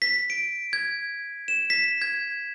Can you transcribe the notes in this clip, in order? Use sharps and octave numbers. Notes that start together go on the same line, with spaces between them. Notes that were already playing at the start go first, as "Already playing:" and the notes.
B6
D7
G#6
E7
B6
G#6